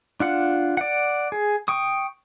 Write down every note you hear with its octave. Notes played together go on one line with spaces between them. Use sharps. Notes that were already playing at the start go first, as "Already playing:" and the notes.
D4 F4 F#5
D5 F#5
G#4
G5 C#6 D#6